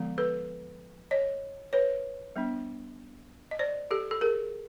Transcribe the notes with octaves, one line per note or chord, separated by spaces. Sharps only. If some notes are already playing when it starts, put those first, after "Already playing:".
Already playing: D3 F3 G#3 B3
A4 B4
C#5 D#5
B4 C#5
G3 B3 D4
D#5
C5 D5
G4 A4
A4
G#4 A#4